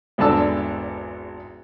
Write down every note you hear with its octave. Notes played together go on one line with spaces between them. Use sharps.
G#1 E2 D3 D4 A5 E6